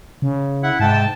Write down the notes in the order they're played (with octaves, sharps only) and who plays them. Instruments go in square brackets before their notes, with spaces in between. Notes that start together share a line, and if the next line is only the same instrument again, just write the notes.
[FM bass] C#3
[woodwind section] E4 F#5
[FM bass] G#2 [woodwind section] C3 G5 A5